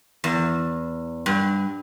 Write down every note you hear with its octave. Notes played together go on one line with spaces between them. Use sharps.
E2
G2